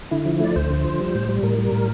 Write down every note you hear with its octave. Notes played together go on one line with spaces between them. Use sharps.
D3 E4
F3
A3 D5
D2 C5
D3
F3
G3
A2
G3
A2 A#4
G3
A2